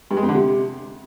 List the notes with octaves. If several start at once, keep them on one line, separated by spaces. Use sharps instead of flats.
G2
G#3
F2
D3
C3